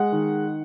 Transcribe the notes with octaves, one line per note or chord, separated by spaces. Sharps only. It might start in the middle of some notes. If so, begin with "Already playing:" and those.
Already playing: G#3 F#5
D#3